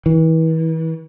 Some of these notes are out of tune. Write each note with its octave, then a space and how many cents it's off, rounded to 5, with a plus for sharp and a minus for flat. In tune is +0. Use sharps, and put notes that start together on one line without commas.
E3 -35